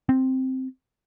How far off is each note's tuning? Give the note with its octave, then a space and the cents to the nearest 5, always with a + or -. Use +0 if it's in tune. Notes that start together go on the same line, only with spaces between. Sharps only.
C4 +0